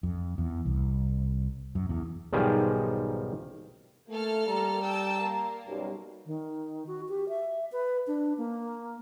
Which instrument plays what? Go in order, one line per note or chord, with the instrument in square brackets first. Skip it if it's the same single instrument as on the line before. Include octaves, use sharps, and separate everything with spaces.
[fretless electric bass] F2
E2
C2
F#2
E2
[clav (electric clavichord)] B1 G#2 D#3 F3 G3 G#4
[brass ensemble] A3 [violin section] A#3 A4 F6
[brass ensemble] G3 A#5
[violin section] G5 A5 E6
A#3
[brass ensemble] B1 F#2 G3
[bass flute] D#3
F#4
G4
E5
B4
D4
A#3